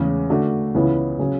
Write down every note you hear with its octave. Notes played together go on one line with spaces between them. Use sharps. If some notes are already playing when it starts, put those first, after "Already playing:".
Already playing: E2 C#3 G#3 C#4
D3 A3 D4 F#4
C#2 C#3 E3 B3 E4
C#3 F#3 C#4 G#4